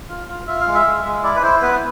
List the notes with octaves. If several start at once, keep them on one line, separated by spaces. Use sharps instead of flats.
F4
F4
F4 E5
F5
G#3
E5
G#3
G#3
E4 D5
B4
E4 C5
B3 B4